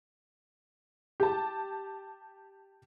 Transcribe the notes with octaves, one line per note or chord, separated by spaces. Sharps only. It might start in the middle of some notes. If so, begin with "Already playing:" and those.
G4 A5